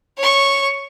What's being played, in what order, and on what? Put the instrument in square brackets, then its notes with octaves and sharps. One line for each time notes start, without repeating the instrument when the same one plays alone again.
[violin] C#5 C#6